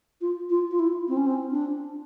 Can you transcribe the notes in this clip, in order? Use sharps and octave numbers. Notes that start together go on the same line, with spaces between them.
F4
F4
F4
E4
C4
C#4
C4
D4